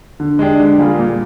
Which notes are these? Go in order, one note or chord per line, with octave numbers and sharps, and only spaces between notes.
D3
G#3 D4 G4
D3
G3 A#3 F4 G#4
A#2